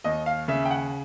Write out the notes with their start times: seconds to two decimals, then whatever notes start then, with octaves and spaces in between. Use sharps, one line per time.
0.04 D#2 D#5
0.26 F5
0.48 C#3 E5
0.65 G5
0.71 F#5